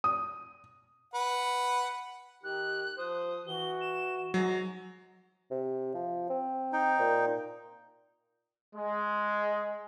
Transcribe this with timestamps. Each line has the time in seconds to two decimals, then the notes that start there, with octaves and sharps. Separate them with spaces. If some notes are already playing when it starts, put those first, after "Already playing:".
0.04 D#6
1.14 B4 F#5
2.44 D#3 G4 F#6
2.98 F3 C5 D#6
3.47 E3 F#4 G7
3.81 E7
4.34 G#2 F#3 A#5
5.51 C3
5.95 F3
6.30 C4
6.73 D#4 G5
6.99 A#2
8.75 G#3